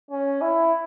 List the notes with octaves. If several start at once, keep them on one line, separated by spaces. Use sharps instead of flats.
C#4
E4